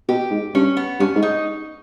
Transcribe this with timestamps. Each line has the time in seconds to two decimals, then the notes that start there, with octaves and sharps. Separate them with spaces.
0.09 B2 G4
0.31 G#2
0.54 G2 C#4
0.77 B3
1.00 G2 C#4
1.16 G#2
1.23 D#4